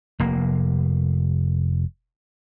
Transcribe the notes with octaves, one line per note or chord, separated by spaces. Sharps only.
F1 A#3